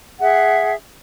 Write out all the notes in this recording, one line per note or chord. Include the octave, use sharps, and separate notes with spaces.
G#4 E5 F#5